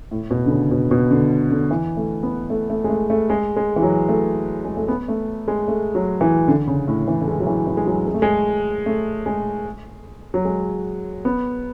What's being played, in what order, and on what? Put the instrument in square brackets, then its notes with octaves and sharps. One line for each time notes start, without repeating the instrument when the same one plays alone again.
[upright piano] A2
B2
D3
C#3
B2
B2
D3
D3
E3
A3
B3
A3
A3
G#3
A3
A3
G#3
G#3
E3
F#3
A3
G#3
A3
B3
A3
G#3
A3
F#3
E3
D3
C#3
A2
E3
A3
G#3
F#3
E3
E3
G#3
F#3
G#3
A3
G#3
A3
G#3
F#3
G#3
B3